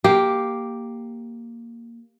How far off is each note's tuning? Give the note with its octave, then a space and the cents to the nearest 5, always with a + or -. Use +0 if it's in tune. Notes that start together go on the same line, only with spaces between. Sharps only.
A#3 +0 G4 +0